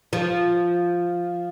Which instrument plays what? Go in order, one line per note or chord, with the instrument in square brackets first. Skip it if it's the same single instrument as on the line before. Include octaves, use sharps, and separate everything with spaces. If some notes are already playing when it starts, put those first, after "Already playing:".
[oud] F3